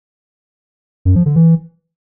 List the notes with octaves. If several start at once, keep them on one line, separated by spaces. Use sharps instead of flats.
F#2
F3
D3
E3